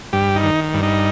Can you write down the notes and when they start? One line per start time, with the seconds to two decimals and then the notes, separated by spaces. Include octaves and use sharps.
0.13 G2 G4
0.36 D#4
0.43 D#3
0.74 G2
0.83 D#4